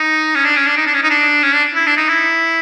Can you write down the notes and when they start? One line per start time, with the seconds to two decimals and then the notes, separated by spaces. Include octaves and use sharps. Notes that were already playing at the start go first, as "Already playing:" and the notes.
Already playing: D#4
0.35 C#4
0.45 D4
0.57 C#4
0.67 D4
0.77 D#4
0.86 D4
0.94 C#4
1.03 D#4
1.10 D4
1.43 C#4
1.54 D4
1.75 E4
1.87 D4
1.97 D#4
2.09 E4